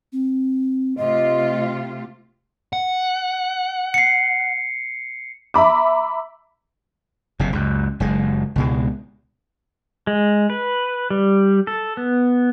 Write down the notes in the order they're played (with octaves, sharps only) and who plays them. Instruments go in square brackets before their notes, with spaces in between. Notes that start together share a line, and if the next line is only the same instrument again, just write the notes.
[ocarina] C4
[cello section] C3 A3 F4 [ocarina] D#5
[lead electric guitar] F#5
[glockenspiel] C7 C#7
[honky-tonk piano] E5 A#5 B5 D6
[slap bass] F#1 C3
C#2 F#2
F#1 G#3
C#2 B2 G#3
[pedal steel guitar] G#3
B4
G3
A4
B3